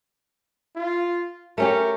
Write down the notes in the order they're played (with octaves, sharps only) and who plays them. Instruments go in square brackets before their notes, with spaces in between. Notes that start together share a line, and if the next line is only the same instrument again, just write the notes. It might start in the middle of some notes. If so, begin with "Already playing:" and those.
[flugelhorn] F4
[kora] A3 C#4 G4 [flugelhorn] A#4